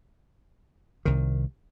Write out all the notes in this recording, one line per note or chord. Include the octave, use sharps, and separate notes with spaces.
C2 D#3